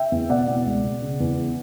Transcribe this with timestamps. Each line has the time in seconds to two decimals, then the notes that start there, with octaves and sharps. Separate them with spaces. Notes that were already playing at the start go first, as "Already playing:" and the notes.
Already playing: E5 G5
0.12 E2
0.30 B2 D5 F#5
0.48 B2
0.66 C#2
0.84 B2
1.02 C#3
1.20 E2
1.38 E3